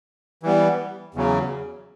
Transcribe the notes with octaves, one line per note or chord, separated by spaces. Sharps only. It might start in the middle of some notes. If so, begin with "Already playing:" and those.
E3 G3 B3
E2 C#3 F#3